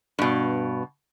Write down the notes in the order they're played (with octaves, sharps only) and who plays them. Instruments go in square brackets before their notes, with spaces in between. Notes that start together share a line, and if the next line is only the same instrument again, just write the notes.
[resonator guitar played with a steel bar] G2 B2